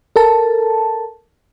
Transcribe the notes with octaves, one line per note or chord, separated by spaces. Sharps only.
A4 A#4 A5